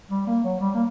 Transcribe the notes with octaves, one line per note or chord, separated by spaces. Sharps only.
G3
A#3
F#3
G3
A#3